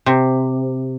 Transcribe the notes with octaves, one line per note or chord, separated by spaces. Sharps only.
C3